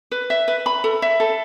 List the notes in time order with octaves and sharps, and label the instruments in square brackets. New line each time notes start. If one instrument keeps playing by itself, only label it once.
[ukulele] B4
E5
B4
B5
A4
E5
A4